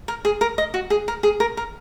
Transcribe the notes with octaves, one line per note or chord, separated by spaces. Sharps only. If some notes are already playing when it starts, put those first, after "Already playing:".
A#4
G#4
A#4
D#5
F#4
G#4
A#4
G#4
A#4
A#4